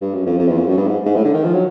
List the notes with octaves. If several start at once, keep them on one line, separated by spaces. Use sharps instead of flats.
G2
F#2
F2
F2
E2
F2
F#2
G2
G#2
G#2
A2
D3
D#3
F3
F#3